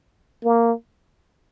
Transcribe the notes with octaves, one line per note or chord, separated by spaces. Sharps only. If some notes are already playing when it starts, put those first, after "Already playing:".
A#3